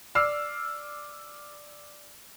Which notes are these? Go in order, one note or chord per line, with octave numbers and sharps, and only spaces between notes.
D5 E6 F6 C7